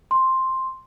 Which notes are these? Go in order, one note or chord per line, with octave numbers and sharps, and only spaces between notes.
C6